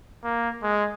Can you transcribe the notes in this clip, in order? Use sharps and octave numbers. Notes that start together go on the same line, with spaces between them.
A#3
G#3